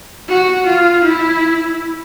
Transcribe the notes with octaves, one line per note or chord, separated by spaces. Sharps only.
F#4
F4
E4